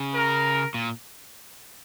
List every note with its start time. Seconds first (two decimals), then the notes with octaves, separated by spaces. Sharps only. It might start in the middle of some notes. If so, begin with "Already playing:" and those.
Already playing: C#3
0.14 A#4
0.74 A#2